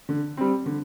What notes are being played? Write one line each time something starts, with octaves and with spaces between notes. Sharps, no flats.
D3
G3 C4
D3